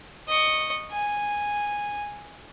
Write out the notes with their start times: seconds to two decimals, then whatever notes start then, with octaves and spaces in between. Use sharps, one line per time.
0.28 D#5 C#6
0.92 G#5